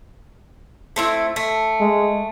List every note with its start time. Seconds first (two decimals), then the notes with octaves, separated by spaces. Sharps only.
0.96 A3 C4 E4
1.36 A3
1.80 G#3